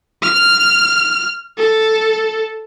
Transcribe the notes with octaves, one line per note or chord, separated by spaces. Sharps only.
F6
A4